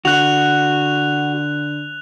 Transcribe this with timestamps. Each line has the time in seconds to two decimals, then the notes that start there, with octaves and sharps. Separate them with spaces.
0.05 D3 F#4 F#6 F7